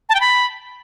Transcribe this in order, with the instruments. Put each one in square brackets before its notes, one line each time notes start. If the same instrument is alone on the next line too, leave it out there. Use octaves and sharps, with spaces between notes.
[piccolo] A5
G5
B5